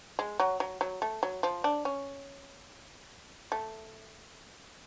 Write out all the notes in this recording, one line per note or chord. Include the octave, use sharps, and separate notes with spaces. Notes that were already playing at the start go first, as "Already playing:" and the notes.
G#3
F#3
F#3
F#3
A3
F#3
F3
D4
C#4
A3